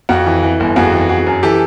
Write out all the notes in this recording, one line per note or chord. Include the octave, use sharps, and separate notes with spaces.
F2 F#4
E3
E3
G1
F2 F#4 G#4
E3
E3 F#4 G#4
F#2
E3 G4 A4